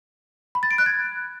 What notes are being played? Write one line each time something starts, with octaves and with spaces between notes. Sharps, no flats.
B5
A6
D7
F#6
G#6